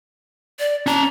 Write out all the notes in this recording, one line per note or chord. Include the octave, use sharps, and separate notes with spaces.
D5
C#4 A5 A#5